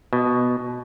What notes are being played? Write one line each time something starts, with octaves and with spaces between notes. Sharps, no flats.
B2